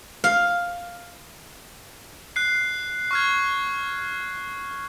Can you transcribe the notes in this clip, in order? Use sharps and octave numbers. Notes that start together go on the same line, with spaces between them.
F5
F#6 C7
C#6 F6 G#6